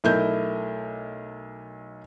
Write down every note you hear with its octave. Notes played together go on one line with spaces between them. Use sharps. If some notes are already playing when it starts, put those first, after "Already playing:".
B1 A3 E4 A#4 D#5 G6